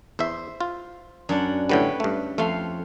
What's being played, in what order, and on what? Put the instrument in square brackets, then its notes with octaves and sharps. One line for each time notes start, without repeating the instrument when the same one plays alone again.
[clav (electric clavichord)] E2 E5 [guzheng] C5
[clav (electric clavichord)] F4
[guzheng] F#2 D4 F#5
[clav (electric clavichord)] A2 D3 G3 [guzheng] B4 C#5 G5
[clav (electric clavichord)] G2 A3
[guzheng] F2 F5 C6 [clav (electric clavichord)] A3